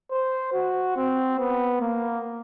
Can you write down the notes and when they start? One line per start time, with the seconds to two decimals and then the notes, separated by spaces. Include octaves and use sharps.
0.11 C5
0.54 F#4
0.96 C4
1.39 B3
1.81 A#3